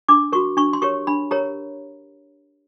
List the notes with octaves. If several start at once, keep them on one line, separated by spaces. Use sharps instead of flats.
D4 D6
F#4 A#4 C#6
D4 C#6
C6
G4 A#4 C#5 C#6
D4 B5
G4 A#4 C#5 A#5